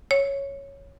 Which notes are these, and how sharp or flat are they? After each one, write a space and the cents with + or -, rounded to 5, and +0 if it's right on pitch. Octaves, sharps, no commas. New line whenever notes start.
C#5 +0